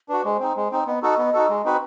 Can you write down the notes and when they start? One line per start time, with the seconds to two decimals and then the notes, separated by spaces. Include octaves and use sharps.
0.09 D4 F#4 B4
0.24 G#3 C5
0.40 C4 D#4
0.56 G#3
0.72 C4 D#4
0.87 B3 D#5
1.03 D#4 F#4 A4 D#5
1.18 B3
1.34 D#4 F#4 A4
1.49 G#3
1.65 C4 D#4 F#4 B4